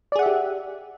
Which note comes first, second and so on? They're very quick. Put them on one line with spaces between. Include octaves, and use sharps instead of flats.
D5 G#4 F#5 E5 G4